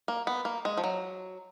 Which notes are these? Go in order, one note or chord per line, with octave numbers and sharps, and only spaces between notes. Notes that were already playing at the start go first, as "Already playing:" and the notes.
A#3
B3
A#3
G#3
F3
F#3